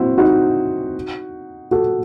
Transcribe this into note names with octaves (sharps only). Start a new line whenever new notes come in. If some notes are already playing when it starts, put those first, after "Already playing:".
Already playing: C4 E4 F#4
D#4 F#4
F#4 A4